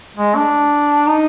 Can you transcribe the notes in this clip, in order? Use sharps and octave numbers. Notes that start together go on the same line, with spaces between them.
G#3
D4
D#4